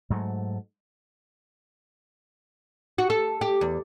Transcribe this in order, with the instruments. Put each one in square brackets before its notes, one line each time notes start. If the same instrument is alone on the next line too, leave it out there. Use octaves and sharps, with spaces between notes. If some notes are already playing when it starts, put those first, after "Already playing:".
[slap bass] G#2 F#3 A3
[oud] F#4
A4
G4
E2